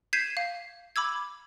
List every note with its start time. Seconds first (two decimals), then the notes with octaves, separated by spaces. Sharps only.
0.13 G6 G#6 B6 C7 D#7 E7
0.37 F5
0.96 B5 D6 E6 G#6